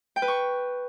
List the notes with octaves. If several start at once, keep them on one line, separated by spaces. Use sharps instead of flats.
G5
B4
C#6